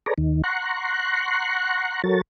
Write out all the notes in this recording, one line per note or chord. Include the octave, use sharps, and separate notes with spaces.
G#4 A4 B4 C#5 D5 A#5
D#2 D#3
F#5 A#5 C6 C#6 F#6
F#3 F#4 A4 A#4 C#5 A6